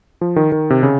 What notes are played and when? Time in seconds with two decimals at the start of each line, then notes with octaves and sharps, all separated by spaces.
0.21 F3
0.36 D#3
0.52 D#3
0.70 C3
0.83 C#3